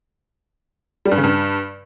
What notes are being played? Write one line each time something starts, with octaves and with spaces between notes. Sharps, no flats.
G3
G2
C#3
G2